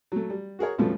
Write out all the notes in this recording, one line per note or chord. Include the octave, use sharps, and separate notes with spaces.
F#3 A3
G3
F#4 G#4 A#4 C#5
C#2 G2 B2 F3 A3 C#4